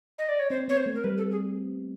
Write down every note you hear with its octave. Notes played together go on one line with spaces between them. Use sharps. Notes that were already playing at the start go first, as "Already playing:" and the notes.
D#5
D5
C#5
C4 C5
B3 C#5
C5
A3
A#4
G3 B4
A4
G#4